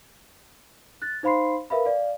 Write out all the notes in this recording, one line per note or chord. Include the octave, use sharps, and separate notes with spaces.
F#6 A6
D#4 C5 F5 B5 C6 C7
A#4 B4 E5 F5 B5
D5 F5